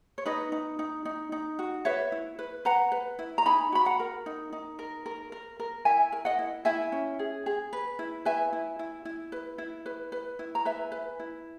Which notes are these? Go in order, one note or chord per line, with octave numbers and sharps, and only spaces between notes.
C#5
D#4 B4 D#5
D#4
D#4
D#4
D#4
F#4
B4 C#5 E5
E4
B4
B4 F#5 A#5
B4
E4
A#5
D#4 G#5 B5
F#4 B5
F#5 A#5
A#4
D#4
D#4
A#4
A#4
A#4
A#4
E4 E5 G#5
A#4
D#5 F#5
E4
E4 E5 G#5
C#4
G#4
G#4
B4
E4
B4 E5 G#5
E4
E4
E4
B4
E4
B4
B4
E4
A#5
B4 E5 G#5
B4
E4